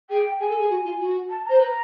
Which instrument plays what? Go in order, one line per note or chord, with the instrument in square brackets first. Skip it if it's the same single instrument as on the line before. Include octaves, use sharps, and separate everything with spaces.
[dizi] G#4 [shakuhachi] G5
[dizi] G#4 [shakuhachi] G#5
[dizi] A4
G#4
F#4
F4
F#4
[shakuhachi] A5
[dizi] C5 [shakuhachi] A#5
[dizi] B4 [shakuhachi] A#5